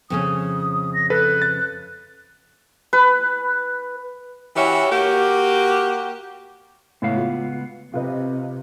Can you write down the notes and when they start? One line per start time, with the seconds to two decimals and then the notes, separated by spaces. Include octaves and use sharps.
0.10 F2 C#3 C#4 D#6
0.94 A#6
1.10 A4 B4 F#6
1.42 A6
2.93 B4
4.56 E3 C#4 F#4 G4 E5
4.91 A#3 F#4 G4
7.02 C#2 A2 B3 F5
7.17 F4
7.94 C3 C4 F4 B4 D#5